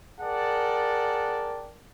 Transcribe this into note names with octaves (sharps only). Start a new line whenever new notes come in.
G#4 A#4 D5 F#5 G5 A5